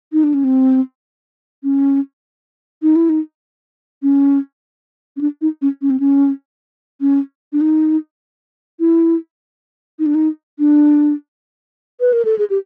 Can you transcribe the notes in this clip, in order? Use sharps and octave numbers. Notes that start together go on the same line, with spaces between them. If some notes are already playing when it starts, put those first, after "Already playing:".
D#4
D4
C#4
C4
C#4
D#4
E4
D#4
C#4
C#4
D4
D#4
C#4
C#4
C4
C#4
C#4
D4
D#4
E4
D#4
D4
D#4
D4
B4
A#4
A4
G#4
G4